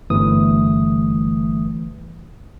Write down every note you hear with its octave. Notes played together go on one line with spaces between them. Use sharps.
G1 E3 A3 D#6